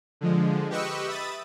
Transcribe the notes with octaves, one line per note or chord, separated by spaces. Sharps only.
D3 F3 G#3
G4 B4 D#5 C#6 E6 F#6
E5 B5 D#6 A6